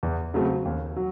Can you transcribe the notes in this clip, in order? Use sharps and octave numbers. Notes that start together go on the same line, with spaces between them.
E2
C#3 F#3 A3 C4
D#2
F#3